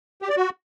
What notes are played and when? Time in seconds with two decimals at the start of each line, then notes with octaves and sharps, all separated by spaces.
0.22 G4
0.29 D5
0.36 F#4